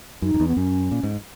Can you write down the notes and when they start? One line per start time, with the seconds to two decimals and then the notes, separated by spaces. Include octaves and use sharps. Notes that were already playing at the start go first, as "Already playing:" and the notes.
0.22 F#2 D#4
0.34 F#2
0.40 E2
0.48 B3
0.57 F#2 C#4
0.91 A#2
1.03 G#2